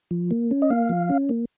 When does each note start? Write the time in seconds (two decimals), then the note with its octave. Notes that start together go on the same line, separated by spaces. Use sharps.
0.11 F3
0.31 A#3
0.51 C#4
0.62 D#5
0.70 A#3 F5
0.89 F3
1.09 C#4
1.29 A#3